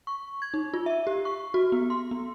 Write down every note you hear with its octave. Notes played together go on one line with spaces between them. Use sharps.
C#6
G#6
D#4
F4
E5
G4
C#6
F#4
B3
C6
B3